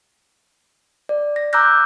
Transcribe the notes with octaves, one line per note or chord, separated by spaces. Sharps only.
D5
A#6
A#5 D6 E6 F#6 G6 A#6